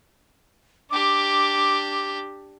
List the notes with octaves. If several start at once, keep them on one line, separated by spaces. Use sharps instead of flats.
D4 G4 D6